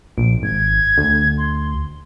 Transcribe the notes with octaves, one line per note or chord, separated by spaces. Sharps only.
A#1 D7
G#1 G#6
D2
C6